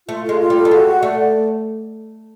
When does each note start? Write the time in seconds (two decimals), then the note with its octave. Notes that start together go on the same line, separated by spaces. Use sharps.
0.08 A3 F4
0.24 G#3 F4
0.39 F4
0.50 G3
0.56 A4
0.65 G3
0.71 G#3 F#4
0.87 F#5
1.03 A3 D5
1.18 D5